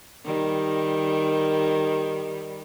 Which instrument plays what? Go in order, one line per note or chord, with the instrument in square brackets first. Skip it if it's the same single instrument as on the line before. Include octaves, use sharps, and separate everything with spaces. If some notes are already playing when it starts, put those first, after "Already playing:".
[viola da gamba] D#3 G3